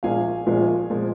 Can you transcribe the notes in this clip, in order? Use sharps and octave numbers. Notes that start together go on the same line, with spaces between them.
A#1 A#2 F3 G#3 F5 G#5
A#1 A#2 F3 G#3
A#2 F3 G#3